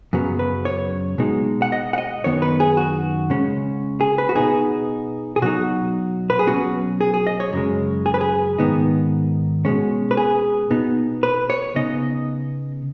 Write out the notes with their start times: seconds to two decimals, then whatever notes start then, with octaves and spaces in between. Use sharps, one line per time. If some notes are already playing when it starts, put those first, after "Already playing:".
0.13 F#2 C#3 F#3 B3
0.39 B4
0.65 C#5
1.18 B2 G#3 D#4
1.62 F#5
1.72 D#5
1.93 F#5
1.98 D#5
2.24 F#2 D#3 B3 D#4 C#5
2.42 B4
2.60 G#4
2.77 F#4
3.30 C#3 G#3 C#4
4.01 G#4
4.18 B4
4.29 F#4
4.36 B2 B3 D#4 G#4
5.36 G#4
5.42 B2 F#3 D#4 F#4
6.30 B4
6.39 G#4
6.47 B2 F#3 C#4 F#4
7.01 G#4
7.14 G#4
7.27 D#5
7.40 C#5
7.53 F#2 C#3 G#3
8.06 G#4
8.14 B4
8.21 G#4
8.58 G#2 D#3 B3 D#4
9.65 B2 G#3 C#4
10.11 B4
10.17 G#4
10.71 B2 B3 D#4
11.23 B4
11.50 C#5
11.76 C#3 B3 D#4 D#5